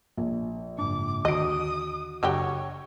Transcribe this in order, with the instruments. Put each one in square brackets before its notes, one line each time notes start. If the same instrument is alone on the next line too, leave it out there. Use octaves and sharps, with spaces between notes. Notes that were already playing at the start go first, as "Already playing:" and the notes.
[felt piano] A#1
[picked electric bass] F#1 G#2 D4 [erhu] D6
[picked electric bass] D#2 D3 [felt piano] F#4 D7 [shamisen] D#5 [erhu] D#6
[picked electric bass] F#1 [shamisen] D3 F#3 G4 [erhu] C#5